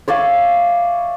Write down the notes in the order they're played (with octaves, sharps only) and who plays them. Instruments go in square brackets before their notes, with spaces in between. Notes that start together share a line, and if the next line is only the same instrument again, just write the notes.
[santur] C#5 D5 E5 F5